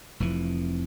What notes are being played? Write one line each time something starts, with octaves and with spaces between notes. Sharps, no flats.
F1 F2 E3